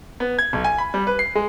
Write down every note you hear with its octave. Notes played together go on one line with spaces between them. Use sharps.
B3
G#6
B1
G#5
B5
G3
B4
C7
G#3